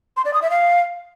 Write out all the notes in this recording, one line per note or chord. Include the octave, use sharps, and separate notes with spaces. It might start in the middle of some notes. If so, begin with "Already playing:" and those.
C6
D5
D#6
E5
F5